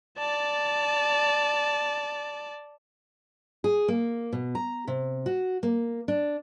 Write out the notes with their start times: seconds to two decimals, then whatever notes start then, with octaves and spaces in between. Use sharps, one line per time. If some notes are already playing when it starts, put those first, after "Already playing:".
0.18 D5 A5
3.64 G#4
3.88 A#3
4.32 B2
4.55 A#5
4.87 C3
5.26 F#4
5.63 A#3
6.08 D4